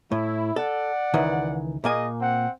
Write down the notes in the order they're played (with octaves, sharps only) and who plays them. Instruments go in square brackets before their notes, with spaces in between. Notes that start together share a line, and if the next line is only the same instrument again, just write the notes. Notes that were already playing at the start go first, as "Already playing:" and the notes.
[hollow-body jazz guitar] A2 [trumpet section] E4
[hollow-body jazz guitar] A4 [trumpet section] D5 F#5
[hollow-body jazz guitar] C#2 D#3 E3
[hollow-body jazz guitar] A#2 A#3 G#5 [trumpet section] G#4 D#5
[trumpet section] C4 F#5